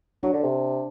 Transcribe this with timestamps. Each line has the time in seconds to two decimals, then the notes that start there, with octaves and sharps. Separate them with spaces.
0.23 F#3 D4
0.33 D3
0.43 C3